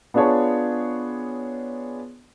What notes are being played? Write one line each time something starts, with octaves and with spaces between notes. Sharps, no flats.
B3 D4 F4 G#4 C#5 A5